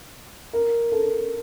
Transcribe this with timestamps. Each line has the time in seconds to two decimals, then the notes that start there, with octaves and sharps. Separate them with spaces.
0.53 A#4
0.92 A4